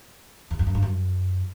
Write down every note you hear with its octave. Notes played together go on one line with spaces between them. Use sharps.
E2
F2
F#2
G2
F#2